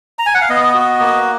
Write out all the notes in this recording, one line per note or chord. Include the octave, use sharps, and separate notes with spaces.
A#5
G#5
F#5
F5
B3 D#5
F#4
A#3